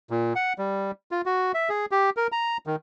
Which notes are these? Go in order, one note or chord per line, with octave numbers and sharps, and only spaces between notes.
A#2
F#5
G3
F4
F#4
E5
G#4
G4
A#4
A#5
D#3